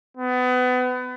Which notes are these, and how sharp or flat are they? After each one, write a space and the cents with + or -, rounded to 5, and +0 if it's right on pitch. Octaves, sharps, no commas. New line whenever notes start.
B3 +30